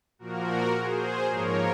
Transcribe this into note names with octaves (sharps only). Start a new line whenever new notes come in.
A#2 F3 A#3 F#4 A#4
G#4 C5
G#2 F3 A#3 A#4 C#5